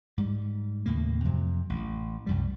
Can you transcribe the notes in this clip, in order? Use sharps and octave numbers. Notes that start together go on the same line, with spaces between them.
G#2 G3
D#2 A2 C#3 A#3
F2 C3 F#3
A1
C2 F#2 G3